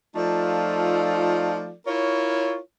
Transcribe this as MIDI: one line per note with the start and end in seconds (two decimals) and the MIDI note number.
0.16 1.71 53
0.16 1.71 57
0.16 1.71 63
0.16 1.71 65
0.16 1.71 69
0.16 1.71 74
1.87 2.58 64
1.87 2.58 65
1.87 2.58 70
1.87 2.58 73